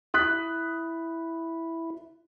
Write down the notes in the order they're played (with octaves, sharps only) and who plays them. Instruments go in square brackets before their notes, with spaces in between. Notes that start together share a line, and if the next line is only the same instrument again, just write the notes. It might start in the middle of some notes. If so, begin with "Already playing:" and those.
[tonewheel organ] E4 [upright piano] D#6 F#6 B6